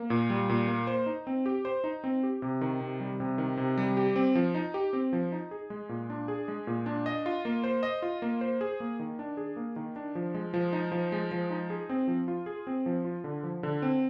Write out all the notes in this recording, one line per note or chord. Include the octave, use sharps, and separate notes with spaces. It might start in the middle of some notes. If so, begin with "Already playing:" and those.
Already playing: A#3
A#2
G3
A#2
A#3
C5
D#4
C4
G4
C5
D#4
C4
G4
C3
D#3
C3
G3
C3
D#3
C3
G3
G4
C4
F3
D#4
G4
C4
F3
D#4
G#4
G#3
A#2
D4
G#4
G#3
A#2
D4
D#5
F4
A#3
C5
D#5
F4
A#3
C5
G#4
A#3
D#3
D4
G#4
A#3
D#3
D4
F3
G#3
F3
D#4
F3
G#3
F3
D#4
G#4
C4
F3
F4
G#4
C4
F3
F4
D3
F3
D3
C4